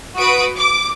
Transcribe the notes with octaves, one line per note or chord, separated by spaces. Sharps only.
F#4 B4 D#6 D7
D6